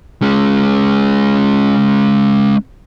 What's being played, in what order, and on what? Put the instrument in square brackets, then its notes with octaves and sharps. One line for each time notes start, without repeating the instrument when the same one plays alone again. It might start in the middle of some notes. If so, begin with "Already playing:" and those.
[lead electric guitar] G#3 C#4